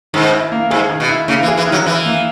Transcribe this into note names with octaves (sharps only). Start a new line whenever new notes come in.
G#2 D#3
E4
A#3
G#2 G#4
D#3
B2
E4
C#3 A#3
E3
G#4
E3
D#3
F#3
E3 E4
A#3